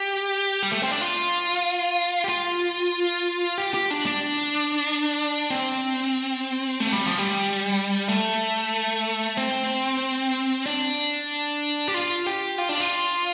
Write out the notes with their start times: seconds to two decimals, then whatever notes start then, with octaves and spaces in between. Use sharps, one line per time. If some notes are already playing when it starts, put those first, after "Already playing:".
Already playing: G4
0.63 G3
0.72 A3
0.82 C4
0.91 D4
1.01 F4
2.24 G4
2.29 F4
3.58 G4
3.74 G4
3.91 D4
4.06 D4
5.50 C4
6.80 A3
6.92 G3
7.06 F3
7.19 G3
8.08 A3
9.37 C4
10.66 D4
11.88 G4
11.94 F4
12.27 G4
12.58 F4
12.69 D4
12.80 F4